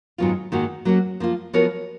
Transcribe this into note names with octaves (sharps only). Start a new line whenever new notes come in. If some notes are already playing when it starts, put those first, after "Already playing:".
G#2 D#3 F#3 B3 F4
G#2 D#3 A#3 D#4 F#4
F#3 A#3 C#4 F#4
F3 A#3 F4
F3 B3 F#4 A#4 C#5